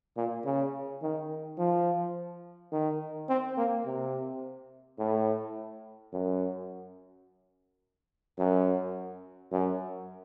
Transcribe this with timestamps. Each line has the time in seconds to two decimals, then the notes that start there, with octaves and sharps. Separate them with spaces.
0.17 A#2
0.45 C#3
1.02 D#3
1.58 F3
2.72 D#3
3.29 C4
3.57 A#3
3.85 C3
4.98 A2
6.12 F#2
8.39 F#2
9.52 F#2